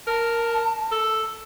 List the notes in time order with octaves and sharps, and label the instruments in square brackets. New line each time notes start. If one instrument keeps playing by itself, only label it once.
[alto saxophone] A#4 [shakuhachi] A5
[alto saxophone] A4